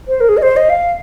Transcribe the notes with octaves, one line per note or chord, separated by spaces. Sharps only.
C5
A#4
G#4
D#5
C5
D#5
F5